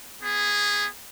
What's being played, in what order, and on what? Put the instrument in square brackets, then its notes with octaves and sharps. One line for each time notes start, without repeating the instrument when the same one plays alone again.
[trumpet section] B3 G#4